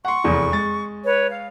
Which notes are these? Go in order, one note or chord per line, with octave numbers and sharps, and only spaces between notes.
F#5 C6 C#6
F1 E2
G#3 A6
B4 C#5
F5